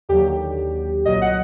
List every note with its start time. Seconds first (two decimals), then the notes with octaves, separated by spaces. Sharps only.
0.09 D#2 D3 F#3 G4
1.05 C2 A#2 F#3 D#5
1.22 F#5